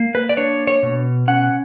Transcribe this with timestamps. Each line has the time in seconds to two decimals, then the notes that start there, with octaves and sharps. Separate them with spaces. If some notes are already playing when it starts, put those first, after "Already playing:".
Already playing: A#3
0.15 B4
0.29 D5
0.37 D4 C#5
0.67 C#5
0.83 B2
1.28 C#4 F#5